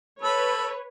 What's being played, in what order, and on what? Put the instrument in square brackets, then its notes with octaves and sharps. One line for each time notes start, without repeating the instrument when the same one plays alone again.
[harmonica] A4 B5 [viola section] B4 C#5